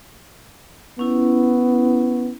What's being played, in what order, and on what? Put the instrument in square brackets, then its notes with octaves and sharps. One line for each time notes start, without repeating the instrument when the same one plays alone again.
[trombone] B3 [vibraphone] C#4 E4